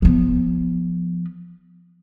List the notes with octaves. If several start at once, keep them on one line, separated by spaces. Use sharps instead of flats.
F3 B3